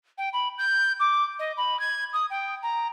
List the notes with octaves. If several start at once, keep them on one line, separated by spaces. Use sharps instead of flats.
G5
B5
G6
D6
D#5
B5
G#6
D#6
G5
A#5